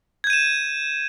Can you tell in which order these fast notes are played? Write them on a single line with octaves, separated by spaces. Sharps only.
G#6 G6 D#7 E7